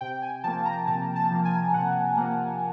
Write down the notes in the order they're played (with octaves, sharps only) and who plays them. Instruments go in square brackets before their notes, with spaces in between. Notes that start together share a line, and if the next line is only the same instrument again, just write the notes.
[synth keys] C3 G5
G#5
F3 A#3 A5
A#5
C3 A5
A5
F3 A#3
G#5
C3 F#5
F3 A#3 F#5